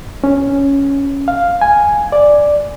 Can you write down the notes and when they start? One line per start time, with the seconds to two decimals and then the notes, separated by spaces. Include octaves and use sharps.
0.24 C#4
1.28 F5
1.61 G#5
2.12 D5